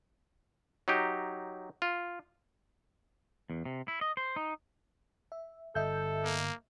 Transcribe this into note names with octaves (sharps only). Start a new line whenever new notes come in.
F#3 D#4 G4
F4
E2
C3
E4
D#5
C5
D#4
E5
G1 A4 D#5 E5 G6
A#3